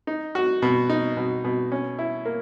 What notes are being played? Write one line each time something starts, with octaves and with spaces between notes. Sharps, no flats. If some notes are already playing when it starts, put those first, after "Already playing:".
D#4
F#4
B2
D#4
B2
B2
C#4
E4
A#3